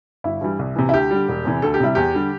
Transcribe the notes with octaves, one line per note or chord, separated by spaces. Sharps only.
G1 E4
G2 E3 G3
C2
C3 E3
E4
D2 G4
D3 G3
E1
E2 C3 E3
D2 A4
G4
C3 G3 E4
E2 G4
D3 G3